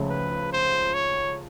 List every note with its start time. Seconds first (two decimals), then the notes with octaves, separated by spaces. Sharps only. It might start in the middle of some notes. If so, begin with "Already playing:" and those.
Already playing: C#2 C#3 F3 A3 C#4
0.10 B4
0.53 C5
0.94 C#5